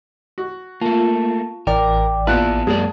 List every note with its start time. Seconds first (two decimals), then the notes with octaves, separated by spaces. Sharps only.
0.38 F#4
0.81 A3 A#3 F4 A5
1.67 A1 E3 A#4 D5 G5 D6
2.27 A#2 B3 E4 F4 B4 A5 F#6
2.67 F#2 G#3 A#3 D5